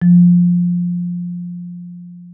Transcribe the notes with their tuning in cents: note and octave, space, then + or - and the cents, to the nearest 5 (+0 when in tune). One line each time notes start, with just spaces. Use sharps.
F3 +10